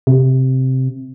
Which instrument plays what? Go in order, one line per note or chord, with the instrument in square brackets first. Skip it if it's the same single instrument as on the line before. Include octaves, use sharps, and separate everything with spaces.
[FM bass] C3